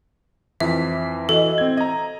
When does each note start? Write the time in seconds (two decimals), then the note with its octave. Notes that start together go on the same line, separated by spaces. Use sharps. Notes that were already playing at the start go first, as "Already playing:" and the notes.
0.60 F2 E3 E5 B6
1.29 E3 F#4 A4 D#5
1.58 C4 G#6
1.77 D#5 F5 A#5